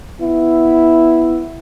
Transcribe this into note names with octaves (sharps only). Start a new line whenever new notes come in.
B3 E4